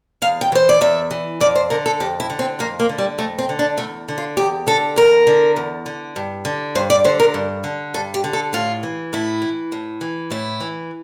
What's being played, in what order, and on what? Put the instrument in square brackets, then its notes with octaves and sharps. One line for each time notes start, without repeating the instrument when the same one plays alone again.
[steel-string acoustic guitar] E2 F5
G5
E3 C5
D5
E2 E5
E3
F2 D5
C5
D3 A#4
A4
F2 G4
E4
D3
C4
F2 A#3
A#3
D3
G3
F2 A3
C4
D3
D4
E2 A3
D3
F4
E2 G4
D3 A4
E2 A#4
D3
E2
D3
G2
D3
G2 C5
D5
D3 C5
A#4
G2
D3
G2 A4
G4
D3
A4
A2 F4
E3
A2 E4
E3
A2
E3
A2 E4
E3